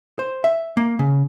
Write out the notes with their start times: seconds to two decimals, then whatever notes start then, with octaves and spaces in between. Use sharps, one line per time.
0.19 C5
0.44 E5
0.77 A#3
0.99 C#3